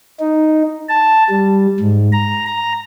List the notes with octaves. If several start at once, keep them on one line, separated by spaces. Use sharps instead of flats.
D#4
A5
G3
G#2
A#5
A#5